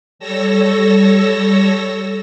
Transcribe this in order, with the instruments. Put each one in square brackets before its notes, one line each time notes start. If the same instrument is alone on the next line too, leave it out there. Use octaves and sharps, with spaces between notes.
[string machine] G3 A4 C#5 E6 A#6